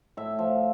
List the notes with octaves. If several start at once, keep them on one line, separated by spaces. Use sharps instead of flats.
A2 E5
F3